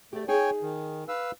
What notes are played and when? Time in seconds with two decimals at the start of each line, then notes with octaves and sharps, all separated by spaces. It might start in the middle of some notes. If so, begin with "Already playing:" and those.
0.13 A3 G4 D5
0.28 D#4 G#4 C#5 G5 G#5
0.62 D#3
1.08 B4 F5 E6